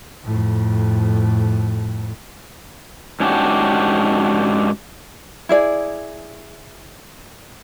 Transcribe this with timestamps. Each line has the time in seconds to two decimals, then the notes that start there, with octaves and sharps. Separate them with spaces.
0.24 F2 A2
3.20 G#2 C#4 D4 F#4 G4
5.49 E4 G#4 D5